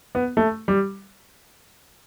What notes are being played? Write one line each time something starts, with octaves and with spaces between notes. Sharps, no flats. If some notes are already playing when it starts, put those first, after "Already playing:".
B3
A3
G3